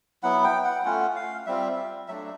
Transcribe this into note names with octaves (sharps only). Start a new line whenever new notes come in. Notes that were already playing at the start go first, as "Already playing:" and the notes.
F#3 B3 E4 F#5
G5
F#5
A3 C#4 F4 F#5
F5
G3 C4 F4 E5
F#3 A3 D4 E5